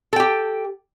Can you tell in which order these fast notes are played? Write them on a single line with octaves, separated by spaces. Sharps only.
A4 G5 G4